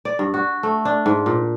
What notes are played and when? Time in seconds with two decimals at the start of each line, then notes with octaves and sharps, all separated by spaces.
0.05 D5
0.19 G2
0.34 F#4
0.63 A3
0.85 D4
1.06 G#2
1.26 A#2